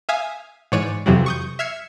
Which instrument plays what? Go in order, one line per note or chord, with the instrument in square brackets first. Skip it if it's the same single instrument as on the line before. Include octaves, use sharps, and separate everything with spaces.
[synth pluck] E5 F5 G#5 D#6
G#2 E3 C#5 D5 D7 D#7
F2 C3 E3 F#3 G3
C#6 D#6 G6
E5 E6 F6 G#6 C7 C#7